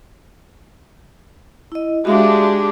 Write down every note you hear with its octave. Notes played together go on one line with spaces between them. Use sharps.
E4 D#5
G#3 D4 F#4 G4 E5 F5